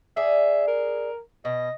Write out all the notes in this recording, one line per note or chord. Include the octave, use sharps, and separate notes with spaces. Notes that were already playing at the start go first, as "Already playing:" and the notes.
G#4 D5 E5
A#4
B2 D#5